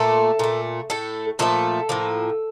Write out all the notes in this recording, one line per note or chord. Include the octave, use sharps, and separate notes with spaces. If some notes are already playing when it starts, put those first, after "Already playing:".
Already playing: A#2 A3 A4
A#2 A3
A2 A3 A4
A#2 F3 A3 A4
A2 F3 A#3